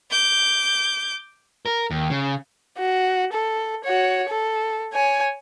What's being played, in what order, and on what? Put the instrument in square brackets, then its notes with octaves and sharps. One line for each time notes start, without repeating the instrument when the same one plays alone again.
[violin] D6 G6
[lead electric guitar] A#4
D#2
C#3
[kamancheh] F#4
A4
F#4 C#5
A4
C#5 G#5